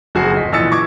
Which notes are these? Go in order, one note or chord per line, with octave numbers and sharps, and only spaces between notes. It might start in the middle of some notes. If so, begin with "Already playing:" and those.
F#1 F2 F#4 G#4 G#5 C7
D1 D#5 B6
A#1 E3 D#5 E6 A6 C#7
C#6 D6 G#6 C#7